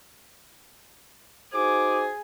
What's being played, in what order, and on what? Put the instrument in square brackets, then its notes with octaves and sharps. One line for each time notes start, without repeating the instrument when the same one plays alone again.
[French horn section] D#4 F#4 C5 [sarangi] G#4 [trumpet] D6